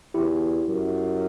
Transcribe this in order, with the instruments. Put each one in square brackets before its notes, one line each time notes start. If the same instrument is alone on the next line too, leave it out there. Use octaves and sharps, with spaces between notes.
[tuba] E2 [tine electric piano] E4 G4
[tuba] F#2